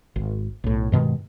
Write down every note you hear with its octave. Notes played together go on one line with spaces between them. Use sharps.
G#1
B1 A2
G2 B2 D#3 G#3